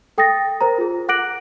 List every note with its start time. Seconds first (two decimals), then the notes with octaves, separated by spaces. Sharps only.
0.18 A4 G5 D#6 A6 A#6
0.61 A#4 C5 A#5
0.78 F4 G#4
1.09 F#5 D6 F#6 A#6 D7 F#7